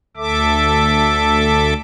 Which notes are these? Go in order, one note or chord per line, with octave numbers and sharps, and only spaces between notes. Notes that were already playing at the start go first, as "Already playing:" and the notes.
D2 A4 E5 D6